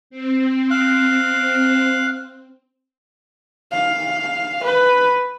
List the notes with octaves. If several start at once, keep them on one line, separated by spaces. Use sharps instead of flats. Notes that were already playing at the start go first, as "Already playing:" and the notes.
C4
F5 F#6
F5
B4